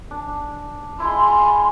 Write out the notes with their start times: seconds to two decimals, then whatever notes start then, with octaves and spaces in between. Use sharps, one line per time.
0.11 D4
1.00 G#3 E4 C6